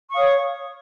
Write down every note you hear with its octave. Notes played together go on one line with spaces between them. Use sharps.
C#5 F5 C#6 D#6